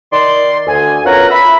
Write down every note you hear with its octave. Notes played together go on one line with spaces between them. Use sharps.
D#3 D5 C6
D2 G#5
B3 C#4 F4 A#4 F#5 A#5
E5 B5